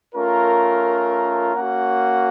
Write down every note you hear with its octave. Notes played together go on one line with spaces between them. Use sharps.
A3 C#4 F4 A#4
A#3 C#4 F#4 F#5